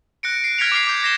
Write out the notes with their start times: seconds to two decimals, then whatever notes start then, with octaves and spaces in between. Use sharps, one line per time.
0.23 F#6 A#6 C#7 D7
0.44 C7 D7
0.58 F6 G#6 A#6 B6 C#7 F7
0.72 D6 F6 C7
0.87 D6 G6
1.03 D6 A#6 C7 E7 G7